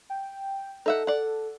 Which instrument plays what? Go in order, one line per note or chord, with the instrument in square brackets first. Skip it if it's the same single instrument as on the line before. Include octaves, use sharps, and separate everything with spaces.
[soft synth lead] G5
[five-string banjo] D#4 E5 F#5 [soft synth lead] A4
[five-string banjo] D5 F#5